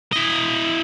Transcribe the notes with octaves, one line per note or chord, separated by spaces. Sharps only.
E4 D#5